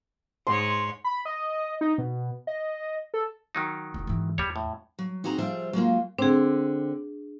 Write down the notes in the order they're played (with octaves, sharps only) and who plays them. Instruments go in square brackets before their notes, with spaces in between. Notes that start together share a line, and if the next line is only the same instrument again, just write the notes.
[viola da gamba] G#2 C#5 [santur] C6
[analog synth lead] B5
D#5
D#4
B2
D#5
A4
[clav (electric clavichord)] D#3 F#3 D#4
[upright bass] E1 F2
G#2 E3
[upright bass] E2 [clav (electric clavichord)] G3 C#5
[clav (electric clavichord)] A2
[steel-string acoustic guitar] F#3
C4 D#4 F#4 G#4 A#5
F3 G3 G#4 C5 E5
F#3 G#3 A#3 F4
[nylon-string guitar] D3 C4 [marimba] D4 G#4